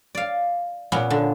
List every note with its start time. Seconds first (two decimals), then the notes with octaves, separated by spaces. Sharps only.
0.15 D5 F5
0.92 A#2 B3 C#4
1.10 D3